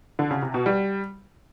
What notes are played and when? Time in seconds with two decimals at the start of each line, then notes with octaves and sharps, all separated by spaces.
0.19 D3
0.31 C#3
0.42 C3
0.54 B2
0.66 G3